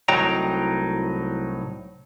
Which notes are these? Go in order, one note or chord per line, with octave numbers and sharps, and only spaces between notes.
C2 A2 F#3 D#4 G5 A#5